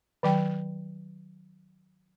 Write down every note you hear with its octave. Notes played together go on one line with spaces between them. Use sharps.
D#3 F#3 G5